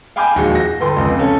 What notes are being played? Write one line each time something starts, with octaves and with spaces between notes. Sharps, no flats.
F5 G5 G#5 B5 D6 G6
A#1 D#2 G#3 F#4
A#6
G1 A4 B4 G5 C6
F1 C#2
C#4 A4